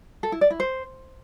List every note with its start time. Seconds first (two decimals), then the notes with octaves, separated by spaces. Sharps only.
0.23 A4
0.32 E4
0.41 D5
0.50 E4
0.60 C5